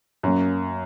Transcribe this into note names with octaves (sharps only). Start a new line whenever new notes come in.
F#2 F#3 A#3 C#4